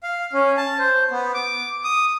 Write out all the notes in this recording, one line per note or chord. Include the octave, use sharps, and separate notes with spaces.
F5
C#4
A5
C5
B3
D6
D#6